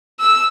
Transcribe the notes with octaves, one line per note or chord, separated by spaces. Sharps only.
E6